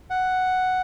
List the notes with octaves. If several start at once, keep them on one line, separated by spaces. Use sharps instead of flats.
F#5